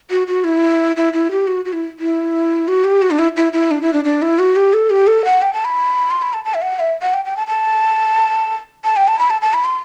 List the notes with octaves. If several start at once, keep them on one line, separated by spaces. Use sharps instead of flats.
F#4
F#4
E4
E4
E4
G4
F#4
F#4
E4
E4
F#4
G4
F#4
D4
E4
E4
E4
D4
E4
D4
D4
E4
F#4
G4
A4
G4
A4
F#5
G5
A5
B5
C6
B5
A5
A5
E5
F#5
E5
F#5
G5
G5
A5
A5
A5
G5
A5
B5
A5
A5
B5
C6